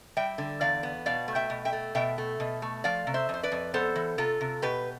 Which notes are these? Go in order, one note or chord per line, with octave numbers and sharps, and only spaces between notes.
G3 E5 G5
D3
E2 D5 F5
B3
B2 D5 F5
A3
E5 G5
B2
E5 G5
A3
B2 E5 G5
A3
B2
A3
F3 D5 F5
C3
C5 E5
F2 C5
B4 D5
F2
B3 A4 C5
E3
C3 F4 A4
C3
B2 G4 B4